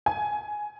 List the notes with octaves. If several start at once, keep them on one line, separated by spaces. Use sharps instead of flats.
G#5